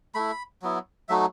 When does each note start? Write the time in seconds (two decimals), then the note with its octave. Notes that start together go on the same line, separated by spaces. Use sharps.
0.14 A3 E4 B5
0.62 F#3 B3 E4
1.09 F#3 A3 D#4 F#4 E5